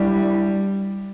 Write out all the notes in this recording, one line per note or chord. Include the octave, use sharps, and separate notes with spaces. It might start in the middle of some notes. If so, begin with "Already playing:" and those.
Already playing: G3 D4 E4